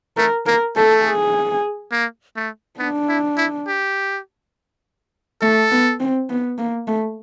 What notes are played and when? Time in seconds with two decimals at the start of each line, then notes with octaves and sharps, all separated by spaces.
0.17 A3 A#4
0.46 A#3 A#4
0.76 A3 A4
1.04 G#4
1.92 A#3
2.36 A3
2.79 B3 D4
3.08 E4
3.37 E4
3.67 G4
5.41 A3 A4
5.71 B3
6.00 C4
6.29 B3
6.58 A#3
6.87 A3